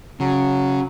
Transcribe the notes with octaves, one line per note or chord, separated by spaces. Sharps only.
C#3 F#3